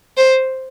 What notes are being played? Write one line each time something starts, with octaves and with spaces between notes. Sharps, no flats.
C5